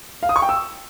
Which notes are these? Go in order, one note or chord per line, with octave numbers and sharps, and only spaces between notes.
F5
D#6
C#6
G5
E6